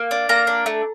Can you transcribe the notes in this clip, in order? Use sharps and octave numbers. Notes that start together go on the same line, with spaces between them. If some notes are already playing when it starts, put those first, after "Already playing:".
Already playing: A#3
D4
A#3 A#5
D4
A3